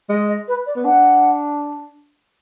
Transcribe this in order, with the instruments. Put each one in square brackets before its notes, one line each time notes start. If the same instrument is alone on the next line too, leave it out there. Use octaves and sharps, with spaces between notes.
[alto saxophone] G#3 [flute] D#5
[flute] D#5
B4
D5
[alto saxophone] B3
[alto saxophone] D4 [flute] F#5